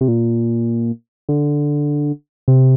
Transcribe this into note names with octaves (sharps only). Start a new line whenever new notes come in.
C3
A#2
D3
C3